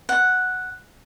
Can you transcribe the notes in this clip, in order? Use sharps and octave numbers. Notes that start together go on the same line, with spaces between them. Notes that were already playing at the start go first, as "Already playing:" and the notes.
F#5